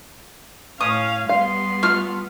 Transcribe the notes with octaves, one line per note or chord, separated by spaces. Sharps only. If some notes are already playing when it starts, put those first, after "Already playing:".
A2 C#4 F5 D#6
G3 B3 F5 C6
A3 F4 F6